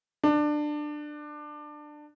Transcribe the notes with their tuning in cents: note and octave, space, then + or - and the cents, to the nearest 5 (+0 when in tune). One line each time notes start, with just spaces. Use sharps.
D4 +20